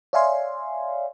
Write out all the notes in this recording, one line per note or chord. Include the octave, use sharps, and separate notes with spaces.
C#5 D5 E5 F5 G#5 C6